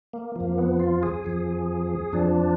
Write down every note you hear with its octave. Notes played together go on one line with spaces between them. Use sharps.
A#3
F2 F3 A#3
B3
F4
G#4
F2 F3
F2 F3 D4